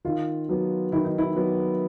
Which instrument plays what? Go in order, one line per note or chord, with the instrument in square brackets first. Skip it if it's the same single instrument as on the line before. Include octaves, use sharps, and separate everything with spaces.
[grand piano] D#3 [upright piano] F4
[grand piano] F#3 B3
[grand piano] D#3 [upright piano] E4
[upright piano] D#4
E4
[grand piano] F#3 B3